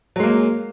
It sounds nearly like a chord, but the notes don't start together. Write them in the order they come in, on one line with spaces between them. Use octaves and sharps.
F#3 G#3 A#3